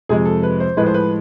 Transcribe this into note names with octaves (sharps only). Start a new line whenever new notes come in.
F2 C3 F3 G#3 G#4
A4
B4
C5
A2 F3 G#3 B4
C5
B4